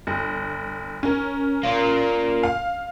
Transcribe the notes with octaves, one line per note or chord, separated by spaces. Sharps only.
G1
C#4 A#4
A#3 F4
F5